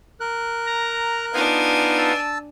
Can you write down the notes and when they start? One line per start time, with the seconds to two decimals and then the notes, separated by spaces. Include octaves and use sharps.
0.20 A#4 F#6
0.66 A#5
1.33 B3 D4 D#4 F4 G#5
1.98 A5 E6